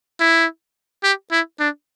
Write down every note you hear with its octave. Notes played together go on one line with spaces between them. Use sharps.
E4
G4
E4
D4